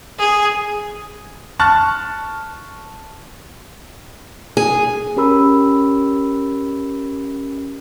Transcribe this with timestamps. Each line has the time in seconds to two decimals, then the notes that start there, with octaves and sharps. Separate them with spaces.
0.20 G#4
1.59 A5 C#6 F6 F#6 A6
4.57 G#4
5.16 C#4 G4 A#4 B5 E6